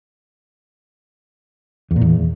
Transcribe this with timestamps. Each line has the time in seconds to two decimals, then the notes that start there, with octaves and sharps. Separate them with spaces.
1.91 E2
1.96 A#2
2.01 E2